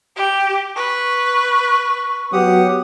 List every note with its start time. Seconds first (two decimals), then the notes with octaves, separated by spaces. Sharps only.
0.17 G4
0.76 B4 C#6
2.33 F#3 B3 G4 F#5 D#6